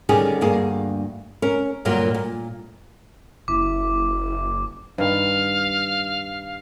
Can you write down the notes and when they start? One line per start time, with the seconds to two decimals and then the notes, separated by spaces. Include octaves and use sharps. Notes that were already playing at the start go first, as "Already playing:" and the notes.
0.09 D3 D#3 G3 C#4 G4 G#4
0.41 D2 G2 A#3 G#4
1.42 C#4 A#4
1.85 D2 G2 A#2 F#3 A#4
2.14 A#2
3.48 F#1 E4 D6
4.98 G2 D#3 F5